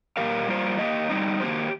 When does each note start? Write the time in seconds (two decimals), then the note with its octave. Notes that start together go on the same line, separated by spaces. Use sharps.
0.17 A#2 A#3 G4 A#4 F5
0.48 G3 A#3 F4 C5
0.79 A#3 G4 D#5
1.10 G3 C4 D#4
1.41 D#3 A#3 G4 C5